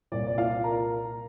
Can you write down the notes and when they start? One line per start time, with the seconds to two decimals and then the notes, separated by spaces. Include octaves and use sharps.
0.12 C2 A#2 D5
0.27 D5
0.38 F4 F5
0.64 A#4 A#5